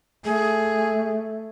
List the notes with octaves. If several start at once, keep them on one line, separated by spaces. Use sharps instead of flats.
A3 G#4